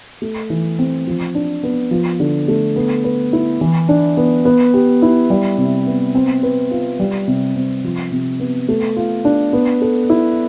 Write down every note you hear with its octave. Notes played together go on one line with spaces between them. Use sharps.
A3
E3
C4
F3
D4
B3
F3
D3
A3
B3
B4
E4
E3
D4
B3
B3
G4
E4
G3
C3
B3
C4
B4
F4
G3
C3
C4
F3
C3
B3
A3
F4
D4
B3
A4
E4